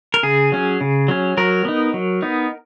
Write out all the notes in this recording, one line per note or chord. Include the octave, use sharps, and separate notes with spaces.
A#4
C#3 G#4
F#3 C#4
C#3
F#3 C#4
F#3 A#4
B3 D#4
F#3
B3 D#4